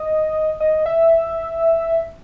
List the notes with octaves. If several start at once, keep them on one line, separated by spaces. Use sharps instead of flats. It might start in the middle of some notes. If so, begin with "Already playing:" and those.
Already playing: D#5
D#5
E5